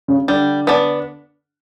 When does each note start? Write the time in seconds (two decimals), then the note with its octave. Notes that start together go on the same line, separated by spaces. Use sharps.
0.08 C#3
0.28 D3 G3
0.67 B3 D4